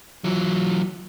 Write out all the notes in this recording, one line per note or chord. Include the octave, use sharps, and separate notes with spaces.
E3 F#3